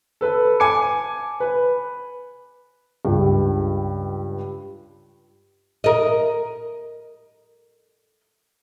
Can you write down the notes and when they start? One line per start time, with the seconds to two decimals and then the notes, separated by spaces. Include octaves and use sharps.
0.21 A4 B4
0.60 G#5 A5 D6 G#6 C#7
1.40 B4
3.05 C#2 G2
5.84 A#4 D#5